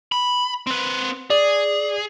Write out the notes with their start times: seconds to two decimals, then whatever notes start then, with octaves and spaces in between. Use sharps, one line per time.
0.12 B5
0.67 C4 B4
1.30 G#4 D5